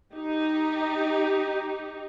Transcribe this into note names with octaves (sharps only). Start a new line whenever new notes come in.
D#4 G4